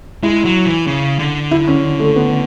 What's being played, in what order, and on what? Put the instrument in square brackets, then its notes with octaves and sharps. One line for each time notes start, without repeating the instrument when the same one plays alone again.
[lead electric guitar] G#3 [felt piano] E4
[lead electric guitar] F#3
E3
C#3
D3
[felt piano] E4
C#4
A3
B3